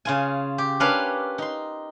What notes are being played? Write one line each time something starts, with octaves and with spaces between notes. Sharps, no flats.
C#3 F4 G#5
G4
C#4 D4 A#4 B4 C#5 F5
D#4 C6